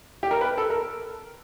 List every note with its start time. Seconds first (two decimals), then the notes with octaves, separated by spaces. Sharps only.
0.23 G4
0.31 A#4
0.41 B4
0.58 A4
0.70 A#4